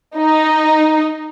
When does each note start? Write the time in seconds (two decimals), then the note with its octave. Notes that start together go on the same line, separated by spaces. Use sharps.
0.15 D#4